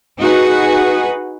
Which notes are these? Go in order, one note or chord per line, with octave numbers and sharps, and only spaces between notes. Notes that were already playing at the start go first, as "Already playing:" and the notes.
D#4 F#4 G#4 B4